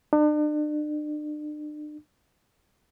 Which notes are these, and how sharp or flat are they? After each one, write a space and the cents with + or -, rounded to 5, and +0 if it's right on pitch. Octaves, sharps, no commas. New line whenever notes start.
D4 +40